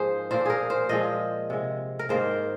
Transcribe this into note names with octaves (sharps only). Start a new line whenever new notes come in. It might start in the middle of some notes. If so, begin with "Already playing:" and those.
Already playing: G#2 F3 A#3 G#4 C5
A#2 F3 A#3 C5
G#4 A#4
C5
A#2 F3 G#3 D#5
C3 G#3
A#4
G#2 D#3 A#3 C5